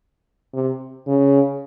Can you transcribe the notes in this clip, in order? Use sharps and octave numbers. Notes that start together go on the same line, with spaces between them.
C3
C#3